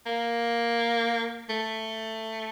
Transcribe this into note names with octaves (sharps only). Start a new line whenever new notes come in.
A#3
A3